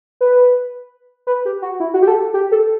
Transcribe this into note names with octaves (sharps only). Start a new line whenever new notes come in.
B4
B4
G4
F#4
E4
F#4
G4
A4
G4
A4